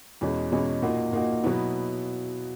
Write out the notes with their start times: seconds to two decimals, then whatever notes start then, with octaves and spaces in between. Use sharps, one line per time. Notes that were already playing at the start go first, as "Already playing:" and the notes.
0.21 E2 B2 G#3 C#4
0.52 E2 B2 G#3 C#4
0.82 A#2 A#3 D#4 F#4
1.13 A#2 A#3 D#4 F#4
1.43 B2 F#3 B3 E4